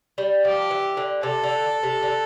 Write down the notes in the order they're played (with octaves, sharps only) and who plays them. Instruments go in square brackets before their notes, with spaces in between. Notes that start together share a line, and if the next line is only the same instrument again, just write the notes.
[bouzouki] G3
[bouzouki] F3 [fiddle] G4
[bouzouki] E3
D3
[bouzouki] C3 [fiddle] A4
[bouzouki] D3
C3
D3